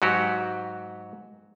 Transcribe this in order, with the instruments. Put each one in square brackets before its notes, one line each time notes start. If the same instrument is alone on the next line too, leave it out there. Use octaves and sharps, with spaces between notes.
[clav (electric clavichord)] G#2 F#3 F#4 G4